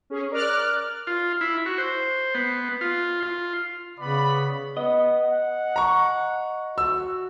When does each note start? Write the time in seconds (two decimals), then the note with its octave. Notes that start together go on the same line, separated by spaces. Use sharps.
0.10 C#4 G#4
0.31 A#4 D5 D6 F6 F#6
1.07 F4
1.41 E4
1.66 F#4
1.78 C5
2.35 B3
2.81 F4
3.23 F4
3.99 C#3 B3 D5 B5
4.77 B3 D#5
5.23 F#5
5.76 A#5 C#6
6.78 F#4 E6